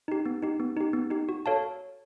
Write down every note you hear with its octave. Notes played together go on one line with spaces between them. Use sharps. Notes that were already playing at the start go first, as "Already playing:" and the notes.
D#4 G4
B3
D#4 G4
B3
D#4 G4
B3
D#4 G4
F#4
A4 C#5 F5 A5